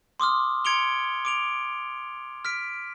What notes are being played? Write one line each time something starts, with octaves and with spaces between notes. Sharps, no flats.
C6 D6 D#6 F6
C6 G#6 C#7 D7 F7 G7
D6 D7 F7
F6 B6 D7